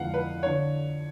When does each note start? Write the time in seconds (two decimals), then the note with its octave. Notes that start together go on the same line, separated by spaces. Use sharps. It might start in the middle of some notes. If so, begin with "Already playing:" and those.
Already playing: F2 D3 F3 G#3 B3 F5 F#5
0.14 B4
0.43 D3 C#5